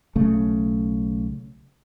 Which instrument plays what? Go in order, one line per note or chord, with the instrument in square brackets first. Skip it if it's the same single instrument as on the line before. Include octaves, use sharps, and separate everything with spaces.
[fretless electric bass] B1 C#3 A3